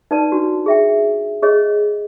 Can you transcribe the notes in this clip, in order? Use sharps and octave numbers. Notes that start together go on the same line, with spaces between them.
D#4 B4 D5 A5
D4 F#4
G#4 E5 G5
G#4 C#5 D#5